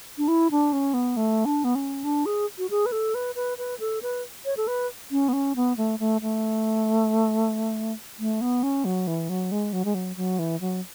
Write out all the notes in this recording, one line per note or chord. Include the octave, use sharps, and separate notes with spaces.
D4
E4
D4
C#4
B3
A3
D4
B3
C#4
D4
G#4
F#4
G#4
B4
A4
B4
B4
B4
A4
B4
C#5
A4
B4
C#4
B3
C#4
B3
A3
A3
A3
A3
B3
C#4
F#3
E3
F#3
G#3
F#3
G#3
F#3
F#3
E3
F#3